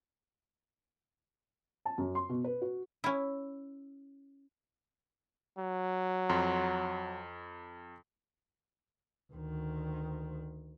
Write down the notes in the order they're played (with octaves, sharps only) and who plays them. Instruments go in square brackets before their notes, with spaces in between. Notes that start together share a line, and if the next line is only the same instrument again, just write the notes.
[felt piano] A5
F#2
C6
B2
B4
F#4
[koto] C#4 E4
[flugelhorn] F#3
[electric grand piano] F2 A#5 C6
[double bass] D2 D#3